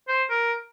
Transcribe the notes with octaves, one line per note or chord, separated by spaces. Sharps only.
C5
A#4